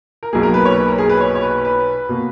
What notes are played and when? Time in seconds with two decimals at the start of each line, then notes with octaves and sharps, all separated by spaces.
0.23 A#4
0.33 B1 B2 A#3 G#4
0.43 A#4
0.54 B4
0.65 C#5
0.77 B4
0.88 A#4
0.98 G#4
1.09 B4
1.21 C#5
1.35 C#5
1.42 B4
1.65 B4
2.09 B2 A#3